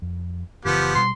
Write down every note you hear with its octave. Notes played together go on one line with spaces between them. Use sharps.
F2
F#1 C#3 E3 F3 B3 G4
B2 G3 C6